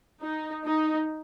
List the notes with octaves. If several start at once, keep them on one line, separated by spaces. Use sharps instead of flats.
D#4
D#4